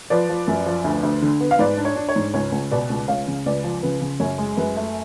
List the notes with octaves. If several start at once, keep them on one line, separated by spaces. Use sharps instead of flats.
F3 B4 D5
F3
F#2
F3
D2
D2
D3
B3
F5
G#2 B4 D5
D4
C#5
D4
C#5
G#2
C#2 C#5
C#2
B2 B4 D5
C#2
C#2 C#5 F5
C#3
C#2 B4 D5
F3
C#3 B4
C#3
F#2 C#5
G#3
F#2 B4
A3